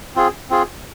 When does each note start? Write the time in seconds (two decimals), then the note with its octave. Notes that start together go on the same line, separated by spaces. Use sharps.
0.16 C4 F4 G#4
0.50 C4 F4 G#4